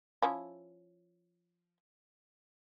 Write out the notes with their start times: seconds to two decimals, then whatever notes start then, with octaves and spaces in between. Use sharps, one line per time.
0.22 F3 C#4 E4